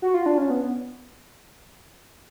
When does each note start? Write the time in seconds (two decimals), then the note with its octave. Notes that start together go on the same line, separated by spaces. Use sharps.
0.02 F#4
0.14 F4
0.26 D4
0.38 C#4
0.50 B3